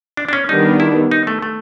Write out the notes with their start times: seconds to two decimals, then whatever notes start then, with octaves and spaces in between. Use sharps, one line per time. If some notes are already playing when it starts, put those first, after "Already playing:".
0.17 D4
0.29 D4
0.33 C#4
0.49 D#3 G3 B3 D4 D#4
0.80 E4
1.11 D#4
1.27 A3
1.42 A3